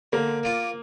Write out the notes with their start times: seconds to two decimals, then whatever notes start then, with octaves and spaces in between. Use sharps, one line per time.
0.13 D3 A#3
0.43 A#3 F4 D5 F5